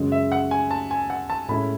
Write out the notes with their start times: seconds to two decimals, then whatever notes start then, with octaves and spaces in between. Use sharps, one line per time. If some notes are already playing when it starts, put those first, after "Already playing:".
Already playing: F#2 C#3 G#3
0.12 E5
0.32 F#5
0.51 G#5
0.71 A5
0.91 G#5
1.10 F#5
1.30 A5
1.48 A2 G#3 C#4 E4 B5